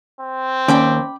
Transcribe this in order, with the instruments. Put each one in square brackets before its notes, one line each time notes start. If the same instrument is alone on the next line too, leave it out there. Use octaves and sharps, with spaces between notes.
[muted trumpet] C4
[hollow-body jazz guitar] D#2 [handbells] C#4 D5 [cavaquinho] G5 B5 D6